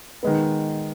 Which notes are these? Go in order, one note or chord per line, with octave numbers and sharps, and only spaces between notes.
D#3 G#3 B3